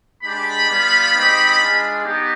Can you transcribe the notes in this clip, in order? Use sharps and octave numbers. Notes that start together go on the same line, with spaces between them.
G#3 D4 G4 B5
G3 B3 F4
G#3 C4 D#4 G4
G#3 D4 F4
B3 D#4 G4